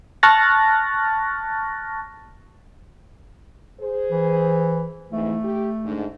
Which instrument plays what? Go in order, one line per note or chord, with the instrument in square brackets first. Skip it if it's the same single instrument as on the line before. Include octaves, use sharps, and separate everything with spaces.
[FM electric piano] A5 C#6 F6 F#6 A6 A#6
[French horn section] G#4 C5
[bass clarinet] E3
[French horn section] F2 G#2 E3 [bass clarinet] A3
[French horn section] G4
G#2 D3